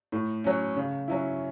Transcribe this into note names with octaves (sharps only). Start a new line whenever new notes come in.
A2
F#3 C#4
C#3
F#3 C#4 E4